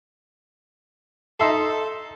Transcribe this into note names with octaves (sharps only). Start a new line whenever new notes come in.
D#4 A4 E5 C6